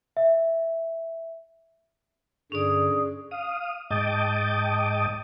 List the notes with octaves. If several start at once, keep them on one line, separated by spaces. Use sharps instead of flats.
E5
G2 D3 C#4 G#4 D5
F5 D#6
G#2 D#5 G5 A5 D6 D#6